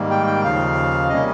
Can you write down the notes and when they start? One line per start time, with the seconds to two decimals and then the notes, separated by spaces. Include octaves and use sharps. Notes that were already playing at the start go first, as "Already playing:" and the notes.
Already playing: G#2 D#3 G3 A#3
0.11 G5
0.26 G5
0.44 D#2 C#3 F3 F5
1.09 C3 G3 A#3 C#4 D#5